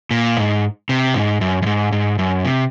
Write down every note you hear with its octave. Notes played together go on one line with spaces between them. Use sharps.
A#2
G#2
C3
G#2
F#2
F#2
G#2
G#2
F#2
C3